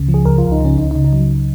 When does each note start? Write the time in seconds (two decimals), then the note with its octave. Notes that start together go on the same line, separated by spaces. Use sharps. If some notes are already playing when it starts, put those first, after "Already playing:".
Already playing: C#2 C#3
0.08 F3
0.14 G#4
0.25 C#2 A#4
0.38 F4
0.43 C#2
0.52 D#4
0.60 C#3 C#4
0.78 C#2 D#4
0.91 C#3 D#4
1.04 D#4
1.13 F#3